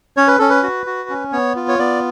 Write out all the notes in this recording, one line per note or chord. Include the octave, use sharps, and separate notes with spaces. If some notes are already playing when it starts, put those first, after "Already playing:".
C#4 C#5
B4
C#4 A4
B4
F#4
F#4
C#4
B3 C#5
F4
C#5
B3 D5